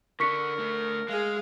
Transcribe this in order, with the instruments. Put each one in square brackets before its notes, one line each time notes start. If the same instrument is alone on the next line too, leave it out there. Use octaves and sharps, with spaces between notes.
[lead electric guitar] D3 D4 [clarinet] A#4 [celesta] C#6 B6 C#7
[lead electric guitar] A3 D4
[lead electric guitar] G#3 [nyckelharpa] G#4 F5